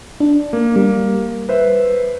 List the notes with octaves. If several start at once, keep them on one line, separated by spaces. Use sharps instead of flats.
D4
A#3
G3 A#3
B4 C5 E5